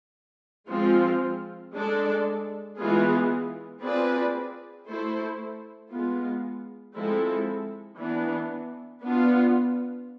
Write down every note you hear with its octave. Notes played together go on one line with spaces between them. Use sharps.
F3 G#3 C4 F4
G#3 D4 A4 D5
E3 G#3 B3 F4 G#4
C4 F4 G#4 B4 D5
A3 E4 A4 C5
G#3 B3 F4
F3 G#3 C4 E4 A4
E3 B3 D4
B3 D4 F4